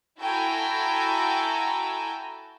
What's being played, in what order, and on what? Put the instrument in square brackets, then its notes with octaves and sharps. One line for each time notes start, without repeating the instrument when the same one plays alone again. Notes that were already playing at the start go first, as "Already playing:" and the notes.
[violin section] E4 F#4 A4 G5 G#5 A#5